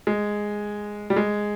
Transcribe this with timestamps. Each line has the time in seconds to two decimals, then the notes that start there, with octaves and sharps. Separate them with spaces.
0.07 G#3
1.10 G3
1.16 G#3